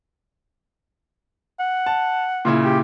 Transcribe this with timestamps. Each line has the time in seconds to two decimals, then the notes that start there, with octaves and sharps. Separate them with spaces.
1.60 F#5
1.86 A5
2.45 A#2 C#3 E4
2.65 G4